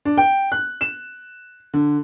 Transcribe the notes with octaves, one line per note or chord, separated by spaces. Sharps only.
D4
G5
F#6
E7
D3